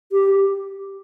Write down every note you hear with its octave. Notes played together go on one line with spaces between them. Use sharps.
G4